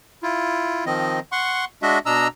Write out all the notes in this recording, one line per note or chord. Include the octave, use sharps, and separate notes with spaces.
E4 F4
D#3 F3 C4 D#5
F#5 C6 C#6
G#3 D4 F#4 D#5 E5
B2 D4 D#5 A#5 E6